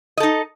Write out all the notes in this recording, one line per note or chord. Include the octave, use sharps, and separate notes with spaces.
D#4 A4 D#5